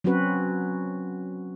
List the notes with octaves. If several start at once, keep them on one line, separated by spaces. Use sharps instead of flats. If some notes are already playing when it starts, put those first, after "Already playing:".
F#3 C4 C#4 F#4 B4